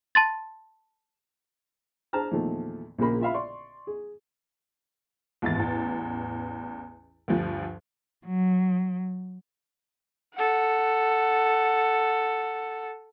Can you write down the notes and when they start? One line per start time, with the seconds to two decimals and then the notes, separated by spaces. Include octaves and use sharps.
0.15 A5 C6 A6
2.13 D4 G#4 C5 A5 A#5 F6
2.31 E2 A#2 D#3 F3 A3
2.98 A#1 A#2 C#3 A#3 B5
3.21 F4 E5 F5 B5
3.34 D5 C6 C#6
3.87 G#4
5.42 D#2 G#2 E3 B3 A6
5.55 A1 E2
7.28 D2 G2 F3
8.27 F#3
10.35 A4 F#5